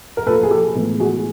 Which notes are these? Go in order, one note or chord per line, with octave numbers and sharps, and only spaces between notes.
A#4
A#2 F3 A#3 A4 B4
G#4
G4 A4
A2 E3 G#3 B3
F#4 G#4